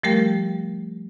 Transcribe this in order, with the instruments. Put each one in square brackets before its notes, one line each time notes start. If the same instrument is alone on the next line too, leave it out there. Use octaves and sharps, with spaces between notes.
[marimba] F3 G3 A3 G4 A#4 G5